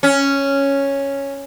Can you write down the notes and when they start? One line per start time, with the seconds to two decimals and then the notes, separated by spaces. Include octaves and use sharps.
0.03 C#4